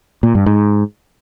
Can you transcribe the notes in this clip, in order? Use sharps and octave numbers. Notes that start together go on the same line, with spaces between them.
A#2
G2
G#2